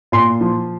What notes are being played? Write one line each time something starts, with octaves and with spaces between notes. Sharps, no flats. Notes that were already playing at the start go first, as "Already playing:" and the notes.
A#2 C6
F3